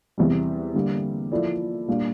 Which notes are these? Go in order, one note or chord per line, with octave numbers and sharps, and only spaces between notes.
E2 C3 G3
D3 G3 A#3
F3 A#3 E4 A4 D5
A#2 G3 A#3 D4 F4